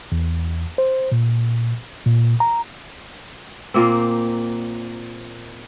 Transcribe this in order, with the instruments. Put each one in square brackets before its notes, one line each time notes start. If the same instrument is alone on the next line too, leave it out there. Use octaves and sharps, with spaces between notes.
[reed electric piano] E2
C5
A#2
A#2
A#5
[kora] A#2 A#3 C4